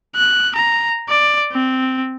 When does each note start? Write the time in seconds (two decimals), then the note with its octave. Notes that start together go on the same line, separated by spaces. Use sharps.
0.16 F#6
0.55 A#5
1.09 D5
1.52 C4